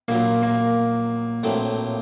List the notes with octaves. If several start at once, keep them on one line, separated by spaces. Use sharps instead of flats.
A#1 A#2 F#3 A#3
A#3
A#1 A2 F#3 A3 C4